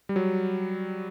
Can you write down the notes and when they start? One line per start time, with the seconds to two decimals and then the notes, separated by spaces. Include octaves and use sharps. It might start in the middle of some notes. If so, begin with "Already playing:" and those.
0.09 G3
0.16 F#3